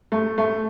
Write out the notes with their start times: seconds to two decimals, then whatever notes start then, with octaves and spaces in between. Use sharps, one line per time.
0.12 A3
0.38 A3